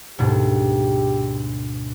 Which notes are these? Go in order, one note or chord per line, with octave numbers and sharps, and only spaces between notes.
D2 G#2 B2 G4